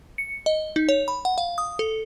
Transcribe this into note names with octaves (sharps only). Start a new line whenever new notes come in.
C#7
D#5
D#4
C#5
B5
F#5
F5
D#6
A4